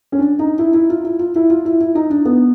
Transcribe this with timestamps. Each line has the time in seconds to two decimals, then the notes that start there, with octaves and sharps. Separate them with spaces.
0.12 C#4
0.19 D4
0.39 D#4
0.59 E4
0.74 E4
0.90 F4
1.04 E4
1.19 F4
1.36 E4
1.50 F4
1.65 E4
1.81 E4
1.95 D#4
2.10 D4
2.25 B3